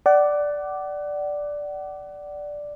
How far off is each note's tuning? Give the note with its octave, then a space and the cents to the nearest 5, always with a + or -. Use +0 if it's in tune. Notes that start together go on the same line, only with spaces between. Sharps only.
D5 +0 F#5 +30